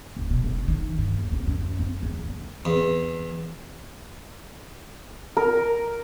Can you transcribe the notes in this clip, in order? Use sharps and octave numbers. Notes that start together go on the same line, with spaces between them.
D#1
B2
F1
D#3
G2
D#2
C4
F#2
C4
E2
G1
E2
A#4